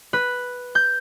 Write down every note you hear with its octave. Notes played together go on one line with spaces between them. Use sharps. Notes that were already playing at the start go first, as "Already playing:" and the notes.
B4
G6